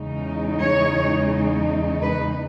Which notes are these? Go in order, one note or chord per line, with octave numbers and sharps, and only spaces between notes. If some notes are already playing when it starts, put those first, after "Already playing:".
Already playing: E2 C#3 E3 G#3 D#4
C#5
B4